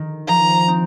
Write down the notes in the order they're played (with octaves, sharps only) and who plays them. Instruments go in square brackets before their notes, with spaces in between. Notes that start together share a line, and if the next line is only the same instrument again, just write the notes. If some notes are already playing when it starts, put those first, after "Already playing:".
Already playing: [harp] D#3
[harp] F3 [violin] A#5
[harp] C4 D#4